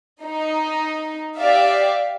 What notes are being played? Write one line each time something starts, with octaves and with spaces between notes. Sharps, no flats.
D#4
G4 D5 E5 F5